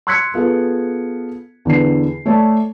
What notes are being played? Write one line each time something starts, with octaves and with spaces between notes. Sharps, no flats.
C6 E6 F#6 G#6 B6 C#7
B3 F4 G#4 A4
E2 D3 B4 C7
A3 C#5 D5 A5